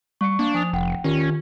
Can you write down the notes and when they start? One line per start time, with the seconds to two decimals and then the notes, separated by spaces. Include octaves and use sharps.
0.21 G3 C#6 C#7
0.39 A#3 D4
0.54 F3 G#5 D#6 F7
0.73 F1 F#5 G5
1.04 D#3 C#4 F4 G4